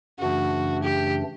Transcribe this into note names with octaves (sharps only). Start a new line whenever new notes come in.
F#2 C#3 E3 A3 D4 F#4
G4